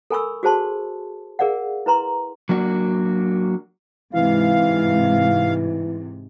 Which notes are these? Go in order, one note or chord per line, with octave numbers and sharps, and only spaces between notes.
A4 A#4 G#5 B5 C#6 E6
F#4 G#4 C5 A5 C6
G#4 A#4 D5 F5 F#5
E4 B4 A#5 C6
F#3 A#3 D4 F#4
G#2 C3 E3 F5